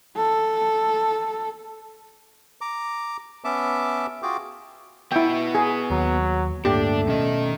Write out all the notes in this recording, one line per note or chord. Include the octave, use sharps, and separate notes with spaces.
A4
A#5 D6
B3 C#4 E5 A5 D6
F4 F#4 G#4 G5 D6
B3 E4 F#4 G5
G#4
D#2 F#3
D1 G2 A3 A#3 D4 G4
B2 D#3 C#4 D#5